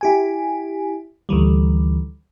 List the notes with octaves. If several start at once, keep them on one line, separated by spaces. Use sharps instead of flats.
E4 G4 G#5
D2 D#3 E3 G3